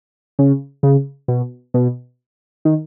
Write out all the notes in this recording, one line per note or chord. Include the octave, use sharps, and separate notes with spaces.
C#3
C#3
B2
B2
D#3